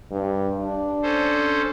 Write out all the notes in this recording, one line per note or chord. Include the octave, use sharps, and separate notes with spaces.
G2
D4
C#4 A4 C5